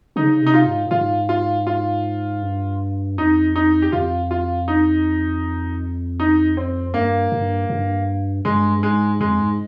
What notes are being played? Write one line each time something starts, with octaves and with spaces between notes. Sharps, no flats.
C#3 D#4
C3
D#4
F4
G#2
A#2
G#2 F4
F4
F4
G2
F2 D#4
D#4
G4
F2 F4
F4
D#4
D#4
C4
G2 A#3
G2
G2
G2 G#3
G#2 G#3
F2 G#3
G#2